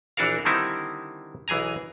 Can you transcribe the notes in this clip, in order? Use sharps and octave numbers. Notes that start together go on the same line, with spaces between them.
A#1 E3 D4 F#4 A#4 F5
D3 D#3 G3 C4 D#4 E4
B1 E3 G#4 G#5 A#5